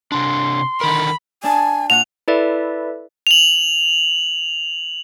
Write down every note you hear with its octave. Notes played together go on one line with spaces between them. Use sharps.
C3 D4 C6
D3 D#3 A#4 B5
D4 G#5 A5
A#2 F#5 F7
E4 A4 B4 D5 E5
F7 F#7